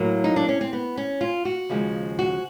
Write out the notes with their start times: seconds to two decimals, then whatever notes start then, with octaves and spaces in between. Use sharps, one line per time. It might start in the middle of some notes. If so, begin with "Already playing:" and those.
Already playing: A2 F#3 A#3
0.24 D#4
0.36 D4
0.49 C#4
0.61 C4
0.73 B3
0.97 C#4
1.21 F4
1.45 F#4
1.70 D#2 C#3 F3 G#3
2.19 F#4